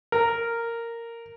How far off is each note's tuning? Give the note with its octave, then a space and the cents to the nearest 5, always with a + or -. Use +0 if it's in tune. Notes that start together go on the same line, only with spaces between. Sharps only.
A#4 -10